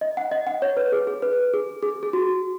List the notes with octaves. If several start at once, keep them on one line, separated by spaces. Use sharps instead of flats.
D#5
F#5
D#5
F#5
C#5
B4
G#4
G#4
B4
G#4
G#4
G#4
F#4